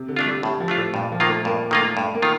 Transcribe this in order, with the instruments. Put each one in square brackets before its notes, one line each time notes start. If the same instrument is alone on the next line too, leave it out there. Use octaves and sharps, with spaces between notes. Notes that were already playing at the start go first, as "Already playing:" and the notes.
Already playing: [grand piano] C3
D3
[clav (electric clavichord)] A3 D4 F4
[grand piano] G3
[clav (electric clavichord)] A2 [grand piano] G3
[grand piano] F3
[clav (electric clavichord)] A3 D4 F4
[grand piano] A2
[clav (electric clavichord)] G2 [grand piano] A#2
[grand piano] F3
[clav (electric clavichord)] D#3 A#3 F4
[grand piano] A3
[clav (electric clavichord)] G2 [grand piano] A#3
[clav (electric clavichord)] D#3 A#3 F4 [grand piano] A3
[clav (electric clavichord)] G2 [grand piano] A3
[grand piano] A#3
[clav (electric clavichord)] D#3 F4